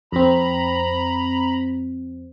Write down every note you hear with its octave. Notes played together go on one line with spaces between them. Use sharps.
F2 C4 A#5 B5